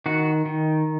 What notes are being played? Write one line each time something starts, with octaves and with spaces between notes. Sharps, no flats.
D#3 F#4
D#3